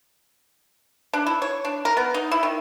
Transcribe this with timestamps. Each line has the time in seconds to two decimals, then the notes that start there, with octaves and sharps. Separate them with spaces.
1.13 D4
1.26 E4
1.42 C#5
1.65 D4
1.85 A#4
1.97 B3
2.14 D#4
2.31 E4
2.43 D#3